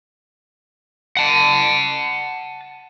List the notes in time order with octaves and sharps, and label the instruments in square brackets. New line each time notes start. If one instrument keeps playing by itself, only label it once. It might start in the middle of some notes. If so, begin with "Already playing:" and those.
[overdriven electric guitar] F#5 A5